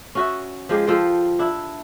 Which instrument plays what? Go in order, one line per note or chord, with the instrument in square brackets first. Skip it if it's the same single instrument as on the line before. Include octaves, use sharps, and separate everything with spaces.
[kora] C#4 F#4 E5
F3 G#3 G4
F3 A4 C5 G5
D4 E4